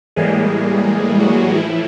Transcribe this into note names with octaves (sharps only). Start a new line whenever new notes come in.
A2 E3 G3 G#3 A#3 G#4
F#3 F#4
A2 E3 F3 E4